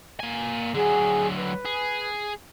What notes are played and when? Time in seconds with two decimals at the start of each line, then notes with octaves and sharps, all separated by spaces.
0.20 A#3 G#5
0.74 D3 F#3 G#4
1.36 B4
1.65 G#4